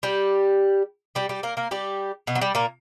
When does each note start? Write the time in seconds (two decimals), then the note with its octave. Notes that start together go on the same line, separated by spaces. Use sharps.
0.03 G3 G4
1.15 G3 G4
1.29 G3 G4
1.43 A#3 A#4
1.57 A#3 A#4
1.71 G3 G4
2.27 B2 B3
2.35 F#3
2.41 G3
2.55 A#2 A#3